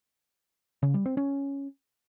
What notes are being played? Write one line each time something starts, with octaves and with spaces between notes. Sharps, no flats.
C#3
G3
C4
C#4